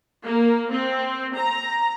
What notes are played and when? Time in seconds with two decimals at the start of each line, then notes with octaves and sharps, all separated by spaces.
0.24 A#3
0.70 C4
1.34 A#5